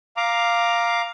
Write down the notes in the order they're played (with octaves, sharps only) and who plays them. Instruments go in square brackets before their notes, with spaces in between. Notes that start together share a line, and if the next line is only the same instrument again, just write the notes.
[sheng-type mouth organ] F5 A#5 D6